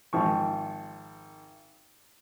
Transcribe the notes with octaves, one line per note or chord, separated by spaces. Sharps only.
G#1 F3 C#6